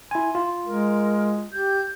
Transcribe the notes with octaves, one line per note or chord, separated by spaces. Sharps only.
E4 G#5 C6
F4
G#3 A#4
G4 G6